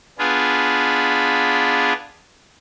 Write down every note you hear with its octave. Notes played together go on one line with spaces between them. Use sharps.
B3 D4 F4 G#4 B4